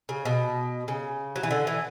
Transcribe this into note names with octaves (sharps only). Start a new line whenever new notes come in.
C#3
B2
C#3
F#3
E3
D3
E3